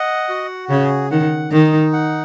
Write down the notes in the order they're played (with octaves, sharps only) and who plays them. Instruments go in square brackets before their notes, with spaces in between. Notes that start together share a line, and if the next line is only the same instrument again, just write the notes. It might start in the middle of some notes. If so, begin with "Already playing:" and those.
Already playing: [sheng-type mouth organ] D#5 F#5
F#4
[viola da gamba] C#3 [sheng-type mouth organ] G#4
[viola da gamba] D#3 [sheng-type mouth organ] F#5
[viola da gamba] D#3 [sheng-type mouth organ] D#4
[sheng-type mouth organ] F#5